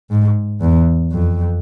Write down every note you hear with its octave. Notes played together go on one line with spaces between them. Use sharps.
G#2
E2
F2